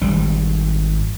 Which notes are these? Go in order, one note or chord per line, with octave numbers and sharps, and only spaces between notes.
G#1 G3